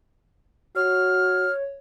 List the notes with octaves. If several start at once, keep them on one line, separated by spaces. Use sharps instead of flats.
F#4 C#5 F6